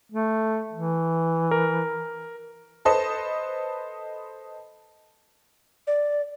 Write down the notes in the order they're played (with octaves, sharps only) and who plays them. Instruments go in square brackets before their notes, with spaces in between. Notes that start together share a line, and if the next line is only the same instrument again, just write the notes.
[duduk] A3
E3
[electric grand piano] A#4
[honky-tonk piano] A4 B4 C5 D#5 A5
[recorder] D5